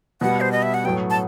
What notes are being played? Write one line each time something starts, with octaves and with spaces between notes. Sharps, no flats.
B2 G3 B3 F#5
C5
D#5
E5
F#5
A2 F#3 B3 G5
A5